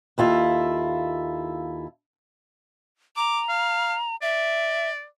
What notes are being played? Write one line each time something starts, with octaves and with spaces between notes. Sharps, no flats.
D#2 E4 F4 A4
A#5 D6
F5
D5 E5